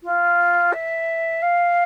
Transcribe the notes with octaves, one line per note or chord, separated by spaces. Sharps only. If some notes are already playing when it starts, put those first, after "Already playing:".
F4
E5
F5